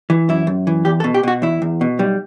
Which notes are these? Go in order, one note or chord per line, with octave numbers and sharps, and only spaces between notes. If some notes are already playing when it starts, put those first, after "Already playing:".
E3
F#2 E4
F#2
E3
E2 G4
A4
B2
G4
B2 F#4
E2 E4
E2
B2
B1 G3